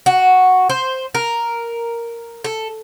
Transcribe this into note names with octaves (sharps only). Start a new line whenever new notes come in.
F#4
C5
A#4
A4